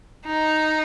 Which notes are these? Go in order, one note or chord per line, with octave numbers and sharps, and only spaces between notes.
D#4